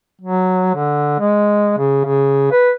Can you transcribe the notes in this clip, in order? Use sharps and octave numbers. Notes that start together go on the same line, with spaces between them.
F#3
D3
G#3
C#3
C#3
B4